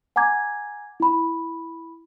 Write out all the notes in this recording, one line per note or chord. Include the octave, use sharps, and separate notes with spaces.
F#5 G#5 A#5 D6 G#6
E4 B5